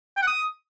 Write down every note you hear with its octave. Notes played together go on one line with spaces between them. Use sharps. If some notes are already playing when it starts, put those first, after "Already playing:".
G5
F#5
D#6